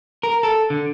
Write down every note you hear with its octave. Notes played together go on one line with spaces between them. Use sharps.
A#4
A4
D3